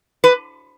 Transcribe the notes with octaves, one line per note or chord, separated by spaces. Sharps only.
B4